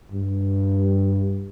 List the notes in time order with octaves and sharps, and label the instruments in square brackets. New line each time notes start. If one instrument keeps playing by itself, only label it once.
[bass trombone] G2